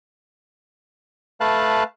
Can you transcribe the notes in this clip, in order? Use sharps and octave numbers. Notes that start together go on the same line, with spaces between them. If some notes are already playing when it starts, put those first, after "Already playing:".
A3 B4 F5 A5 F#6